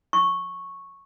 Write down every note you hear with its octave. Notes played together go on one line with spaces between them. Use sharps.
C#6